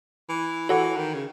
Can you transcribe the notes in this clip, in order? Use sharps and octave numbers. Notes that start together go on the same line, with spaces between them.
E3
E3 F#4 A4 C#5 F#5
D#3
C#3